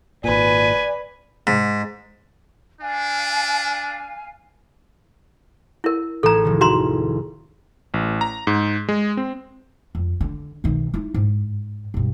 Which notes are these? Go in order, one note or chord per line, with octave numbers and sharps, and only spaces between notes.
G#1 A#2 B4 D5 G#5
G#2
D4 F5 G#5
E4 A#4
A1 G#4 A4 A#5
F1 D#3
F#4 A#5 C6
A1
A#5
G#2
G#3
C4
F2
D3
B1 D#3
D#4 E4
G#2
B1 G2